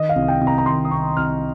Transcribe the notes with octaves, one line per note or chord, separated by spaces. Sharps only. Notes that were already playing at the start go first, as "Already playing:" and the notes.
Already playing: D#3 D#5
F5
C2
G5
C2
A#5
A#5
D#3 C6
D#6
C2 C#6
C2 F6